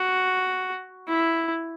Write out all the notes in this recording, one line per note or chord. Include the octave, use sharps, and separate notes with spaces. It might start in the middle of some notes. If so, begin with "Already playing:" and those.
Already playing: F#4
E4